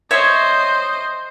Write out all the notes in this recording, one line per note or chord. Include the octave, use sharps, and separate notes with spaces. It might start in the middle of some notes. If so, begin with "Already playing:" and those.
C5 C#5 D#5 E5 C#6